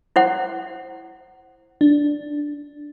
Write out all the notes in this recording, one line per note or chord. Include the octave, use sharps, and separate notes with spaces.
E4 C5 F#5
D4